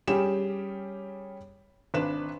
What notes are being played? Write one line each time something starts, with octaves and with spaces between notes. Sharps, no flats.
G3 C#4 G4 G#4 E7
G#1 D4 B4 E7